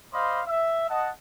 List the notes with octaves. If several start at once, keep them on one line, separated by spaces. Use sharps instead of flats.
C5 D5 D#5 F5 B5 C6
E5
D#5 F#5 A5